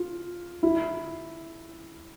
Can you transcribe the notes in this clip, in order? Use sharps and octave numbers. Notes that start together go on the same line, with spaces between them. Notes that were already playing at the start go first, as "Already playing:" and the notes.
Already playing: F4
E4